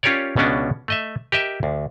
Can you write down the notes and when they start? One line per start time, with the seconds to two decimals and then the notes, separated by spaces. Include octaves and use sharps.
0.03 C#4 F4 G4 A#4 C#5 D5
0.36 C#2 B2 B3 C#4 D4
0.88 A3 D#5 E5
1.32 G4 A#4 D#5 E5
1.63 D2